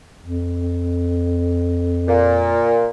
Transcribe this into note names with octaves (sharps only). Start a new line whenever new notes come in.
F2
A#2